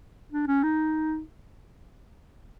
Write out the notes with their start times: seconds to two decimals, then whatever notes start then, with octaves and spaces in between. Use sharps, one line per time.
0.32 D4
0.48 C#4
0.64 D#4